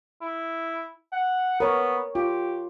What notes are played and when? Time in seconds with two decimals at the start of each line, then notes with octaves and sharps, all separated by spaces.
0.22 E4
1.12 F#5
1.60 B3 A#4 C#5
2.15 F4 G4